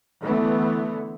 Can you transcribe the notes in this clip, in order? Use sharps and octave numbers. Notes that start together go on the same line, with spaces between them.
D3 E3 A3 B3